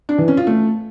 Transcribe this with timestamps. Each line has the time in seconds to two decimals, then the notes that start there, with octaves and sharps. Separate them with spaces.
0.09 D4
0.18 E3
0.28 C#4
0.37 F4
0.47 A3